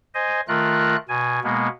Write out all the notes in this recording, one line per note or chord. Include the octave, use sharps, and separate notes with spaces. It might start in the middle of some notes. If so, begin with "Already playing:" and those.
C5 D#5 G#5
D#3 A3 F4 A#4 F#6
B2 G#5
B2 G#3 A#3 B3